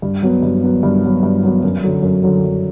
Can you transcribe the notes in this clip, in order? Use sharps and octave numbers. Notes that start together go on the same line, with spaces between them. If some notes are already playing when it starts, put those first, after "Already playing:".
G2
F#3 B3
G2
F#3 B3
G2
F#3 B3
G2
F#3 B3
F#2
D3 F#3
F#2
D3 F#3
F#2